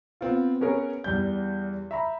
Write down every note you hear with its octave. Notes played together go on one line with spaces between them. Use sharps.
B3 C4 F4
B3 C#4 G#4 A#4 B4 C#5
E2 G3 G6
E5 A#5 B5